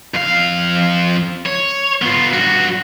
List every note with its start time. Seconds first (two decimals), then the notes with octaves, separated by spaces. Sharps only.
0.14 F2 F5
1.46 C#5
2.02 B3 F4
2.33 G2 F#4